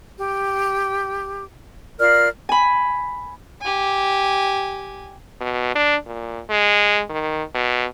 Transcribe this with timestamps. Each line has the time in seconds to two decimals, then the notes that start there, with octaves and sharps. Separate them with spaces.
0.18 G4
1.99 F4 A#4 D5 F6
2.49 G#5 B5
3.61 G4 G#5
5.41 B2
5.75 D4
6.06 A#2
6.49 G#3
7.10 D#3
7.55 B2